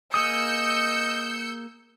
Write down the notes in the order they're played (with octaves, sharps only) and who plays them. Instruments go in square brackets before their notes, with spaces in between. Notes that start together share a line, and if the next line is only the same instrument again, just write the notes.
[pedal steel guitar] A#3 G#4 D#6 [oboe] D#5 [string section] E6 G6 C#7